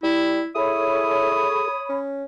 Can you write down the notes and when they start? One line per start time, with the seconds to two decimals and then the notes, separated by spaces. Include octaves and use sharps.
0.03 G3 E4
0.55 E4 G#4 A4 C#5 B5 D#6
1.89 C#4